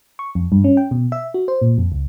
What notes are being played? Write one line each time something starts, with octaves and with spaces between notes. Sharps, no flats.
C#6
F2
G2
C#4
G5
B2
E5
F#4
C5
A#2
F2
C#2